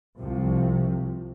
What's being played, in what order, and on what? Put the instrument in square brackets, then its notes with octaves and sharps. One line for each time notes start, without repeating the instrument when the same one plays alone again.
[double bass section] C2 C3 F3